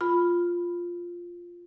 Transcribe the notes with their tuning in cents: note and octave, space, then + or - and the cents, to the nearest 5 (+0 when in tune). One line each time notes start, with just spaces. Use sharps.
F4 +0 B5 +5